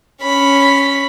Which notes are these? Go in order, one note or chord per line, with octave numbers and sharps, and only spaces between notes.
C#4 B5